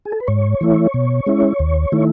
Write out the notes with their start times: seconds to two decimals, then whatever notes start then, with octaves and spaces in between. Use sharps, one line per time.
0.05 G#4
0.12 A4
0.20 B4
0.28 G#2 C#5
0.61 E3 A3 E4
0.94 B2
1.26 G#3 C#4 E4
1.59 D#2
1.92 D#3 A3 E4